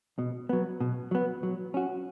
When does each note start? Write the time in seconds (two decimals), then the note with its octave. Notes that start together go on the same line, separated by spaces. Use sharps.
0.19 B2
0.49 F#3 B3
0.80 B2
1.11 F#3 B3
1.43 F#3
1.74 C#4 F#4